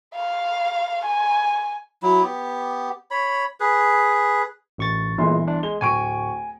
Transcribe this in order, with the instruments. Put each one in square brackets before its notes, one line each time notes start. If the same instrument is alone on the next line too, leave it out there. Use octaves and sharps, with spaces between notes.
[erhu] F5
G#5
[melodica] F#3 E4
B3 G4
C#5 B5
G#4 B4
[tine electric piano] A1 C#6 A6
[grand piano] G1 E3 C6 [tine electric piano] A#2 G#3
[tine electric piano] D4
[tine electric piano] G#3 [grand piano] G7
[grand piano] D1 C#6 D7 [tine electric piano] G#5